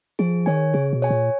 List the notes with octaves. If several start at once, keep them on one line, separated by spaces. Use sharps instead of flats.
F3 G#4
D#3 C#5 G#5
C#3 G#4
B2
C#5 G#5
A#2